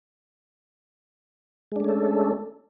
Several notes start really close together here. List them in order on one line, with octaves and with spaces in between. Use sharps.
G#3 D4 A3 C#4 A4